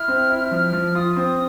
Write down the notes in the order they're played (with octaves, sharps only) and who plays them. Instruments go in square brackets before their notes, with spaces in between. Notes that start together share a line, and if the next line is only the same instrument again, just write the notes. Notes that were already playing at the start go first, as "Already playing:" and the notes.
Already playing: [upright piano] E4 [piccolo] F6
[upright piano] C4
E4
[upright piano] F3 [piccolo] F6
[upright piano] F3
[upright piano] F4 [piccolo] D#6
[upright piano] C4